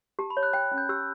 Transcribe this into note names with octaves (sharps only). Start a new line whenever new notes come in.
G4 A5
B5
C#5
F#6
G5 F#6
C#4
G6
G4 E6